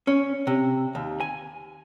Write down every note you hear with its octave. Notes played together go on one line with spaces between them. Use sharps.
C#4
C3
D#2
G#5